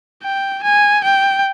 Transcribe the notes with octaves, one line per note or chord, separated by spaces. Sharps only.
G5
G#5
G5